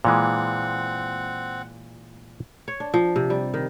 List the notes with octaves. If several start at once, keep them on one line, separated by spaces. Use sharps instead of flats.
A#2 E3 G#3 C4 F#5
C#5
D4
F3
C3
G3
D#3